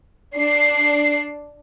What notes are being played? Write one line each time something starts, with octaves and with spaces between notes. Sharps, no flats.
D4 C7